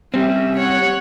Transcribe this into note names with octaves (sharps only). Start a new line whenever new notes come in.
G3 C4 C#4 E5
C#5 F#5